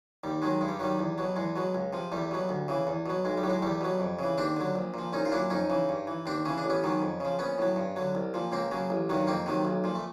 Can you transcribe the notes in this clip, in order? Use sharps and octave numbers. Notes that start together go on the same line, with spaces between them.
D#2 G3
D#3 F#3 G#3
G2 G#3
G3
D#3 F#3 G3
E2
B2 F#3
E2 G#3
B2 F#3
C#2
C3 F3
E2 G3 A3
B2 F#3
D2
C#3 E3
E2
B2 F#3
B1 G#3
G3
A2 F#3
G#3
E2 G3 A3
B2 F#3
F2
C#3 E3
D#2 C4 D4
D3 F#3
A#1
A#2 F3
C2 C#4 D#4
F4
A#2 F#3 D4 E4
F2 C#4 D#4
C#3 E3
G2
E3
D#2 C4 D4
C#3 E3 C#4
D4
A1
B3 C#4
G#2 D#3 F#3
F2
C#3 F3
A#1 B3 C#4
A2 F#3
G2
D3 F#3
C2
A#2 F3
C#2 A#3 C4
C#3 F#3
A1
G2 D#3 F#3
F2 A#3 C4
C3 D#3 F#3
B1
A#2 F3
A3